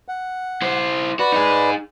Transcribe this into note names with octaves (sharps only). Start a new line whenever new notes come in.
F#5
E4 C5
F#4 B4 D5
D#4 G#4